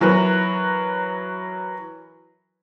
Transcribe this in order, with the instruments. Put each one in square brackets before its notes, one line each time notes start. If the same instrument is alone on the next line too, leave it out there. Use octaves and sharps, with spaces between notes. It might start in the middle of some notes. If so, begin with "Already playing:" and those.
[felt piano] E3 F#3 A#4 B4